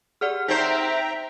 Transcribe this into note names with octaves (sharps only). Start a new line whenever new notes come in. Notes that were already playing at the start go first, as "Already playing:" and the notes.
G4 G#4 D5 F#5 F6
C4 D#4 C5 E5 G5 A#5 B6